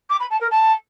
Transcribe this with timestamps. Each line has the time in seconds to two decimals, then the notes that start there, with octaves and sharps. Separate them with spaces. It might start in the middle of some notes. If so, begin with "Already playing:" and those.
0.10 D6
0.20 B5
0.30 A5
0.40 A#4
0.51 A5